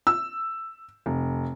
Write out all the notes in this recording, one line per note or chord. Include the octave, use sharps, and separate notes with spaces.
E6
F1